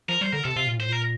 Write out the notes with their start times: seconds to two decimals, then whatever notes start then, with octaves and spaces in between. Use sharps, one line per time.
0.09 F3 A#4
0.21 G3 C5
0.32 D3 A#4
0.44 C3 A4
0.56 C3 F4
0.67 A#2
0.77 A2 C5
0.88 A#2 A#4